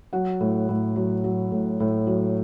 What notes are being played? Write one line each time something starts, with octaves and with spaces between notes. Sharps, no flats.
F#3 F#5
A2
A2
F#3
F#3
A2
A2
F#3